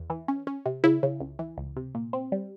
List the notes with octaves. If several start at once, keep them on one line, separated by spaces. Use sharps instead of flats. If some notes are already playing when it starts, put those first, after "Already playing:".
Already playing: E2
E3
C#4
C#4
C3
C#3 E4
C#3
C#2
E3
C#2
C3
A#2
C4
G3